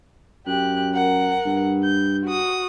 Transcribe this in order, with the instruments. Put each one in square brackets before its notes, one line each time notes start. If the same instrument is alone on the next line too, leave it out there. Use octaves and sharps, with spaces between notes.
[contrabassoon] F#2 [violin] G4 F#6
[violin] A#4 F#5
[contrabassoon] G2
[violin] G6
F#4 D#6